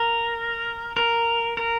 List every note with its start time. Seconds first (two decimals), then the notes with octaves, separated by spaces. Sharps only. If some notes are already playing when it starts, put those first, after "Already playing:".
Already playing: A#4
0.97 A#4
1.57 A#4